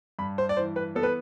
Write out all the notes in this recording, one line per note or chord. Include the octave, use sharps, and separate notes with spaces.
G2 B5
C5
D5
E3 C5
B4
B3 A4
B4